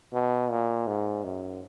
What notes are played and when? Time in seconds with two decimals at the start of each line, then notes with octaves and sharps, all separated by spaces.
0.13 B2
0.50 A#2
0.87 G#2
1.24 F#2